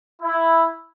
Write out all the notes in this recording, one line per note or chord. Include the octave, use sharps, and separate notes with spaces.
E4